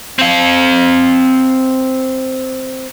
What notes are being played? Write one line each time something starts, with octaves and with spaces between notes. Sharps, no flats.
C4 F5